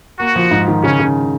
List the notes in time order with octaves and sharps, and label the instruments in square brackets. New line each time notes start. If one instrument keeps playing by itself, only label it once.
[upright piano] A#3 [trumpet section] F#4
[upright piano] F3
G#2
D#3
[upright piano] C#3 [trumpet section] C#4
[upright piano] C#3